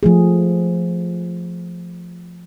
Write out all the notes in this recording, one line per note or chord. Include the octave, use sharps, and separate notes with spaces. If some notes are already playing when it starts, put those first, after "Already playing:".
F3 A3 G#4